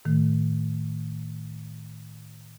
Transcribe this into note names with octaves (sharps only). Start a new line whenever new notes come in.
A2 D#3 A3